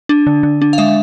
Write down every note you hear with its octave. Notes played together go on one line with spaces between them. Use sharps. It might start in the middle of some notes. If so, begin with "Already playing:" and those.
D4
D3
D3
D4
F5
G#3 E5